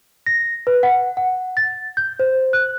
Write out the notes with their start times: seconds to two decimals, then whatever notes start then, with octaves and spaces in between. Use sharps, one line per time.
0.26 A#6
0.67 B4
0.83 F#5
1.17 F#5
1.57 A6
1.97 G6
2.19 C5
2.53 F#6